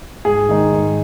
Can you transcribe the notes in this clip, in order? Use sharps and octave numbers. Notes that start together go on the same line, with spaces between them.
G#2 G#4
D#3 G#3 D#4
G#2